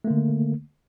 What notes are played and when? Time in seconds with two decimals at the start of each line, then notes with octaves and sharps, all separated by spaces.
0.04 A3
0.07 A#3
0.10 D3